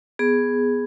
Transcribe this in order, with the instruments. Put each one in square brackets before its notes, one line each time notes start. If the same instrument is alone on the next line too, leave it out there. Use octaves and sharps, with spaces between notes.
[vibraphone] B3 G#4